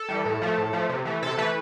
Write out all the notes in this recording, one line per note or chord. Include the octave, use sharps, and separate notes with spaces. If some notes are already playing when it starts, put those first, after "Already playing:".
Already playing: A4
E3 G3
A2
F3 A3
A2
F3 A3
C3
E3 A3
C3 A4
E3 A3 B4